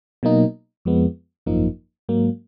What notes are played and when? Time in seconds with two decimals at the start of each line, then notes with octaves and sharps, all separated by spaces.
0.23 B2 F#3 A#3 D#4
0.85 F2 F3 G#3 B3
1.46 G#1 F#2 F3 A#3 D#4
2.09 G#2 F#3 A#3